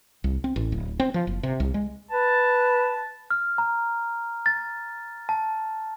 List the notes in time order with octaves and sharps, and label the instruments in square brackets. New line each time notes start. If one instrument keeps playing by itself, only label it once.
[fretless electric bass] C2
C4
A1
D1
C4
F3
F#1
C3
C2
G#3
[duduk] B4 [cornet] A5
[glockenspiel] F6
A#5
A6
A5